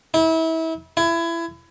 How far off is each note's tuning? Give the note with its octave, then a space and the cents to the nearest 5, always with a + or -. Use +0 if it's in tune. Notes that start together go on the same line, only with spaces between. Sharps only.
E4 -30
E4 +25